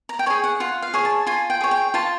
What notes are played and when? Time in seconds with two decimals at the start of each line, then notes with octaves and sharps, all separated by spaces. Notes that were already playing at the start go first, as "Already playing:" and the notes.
0.09 A#5
0.19 G5
0.26 G#4 C#5 G#5
0.44 F#5
0.60 F4 F#5
0.82 F5
0.94 G#4 C#5
1.05 A5
1.27 F4 G#5
1.50 G5
1.61 G#4 C#5
1.71 G5
1.94 F4 A5